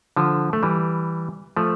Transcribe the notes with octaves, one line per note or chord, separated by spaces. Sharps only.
D3 F3
A3
E3 G3
F3 A3